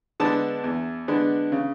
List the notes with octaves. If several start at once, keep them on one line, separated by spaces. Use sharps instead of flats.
D3 G#3 B3 D4 A5
E2
D3 G#3 B3 D4
C#3